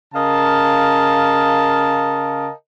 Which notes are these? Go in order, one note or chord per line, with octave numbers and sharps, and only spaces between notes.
C#3 A#4 D#5 F5 A5